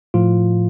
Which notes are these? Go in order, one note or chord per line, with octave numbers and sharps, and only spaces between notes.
A2 F3 F4